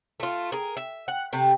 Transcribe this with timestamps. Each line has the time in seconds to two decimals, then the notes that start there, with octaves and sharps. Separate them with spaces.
0.20 A3 F4
0.52 G#4 A#4
0.77 E5
1.08 F#5
1.33 C3 A3